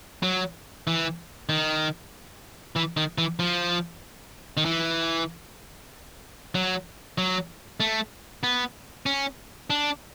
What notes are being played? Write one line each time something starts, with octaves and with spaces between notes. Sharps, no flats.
F#3
E3
D#3
E3
D#3
E3
F3
D#3
E3
F#3
F#3
A3
B3
C#4
D4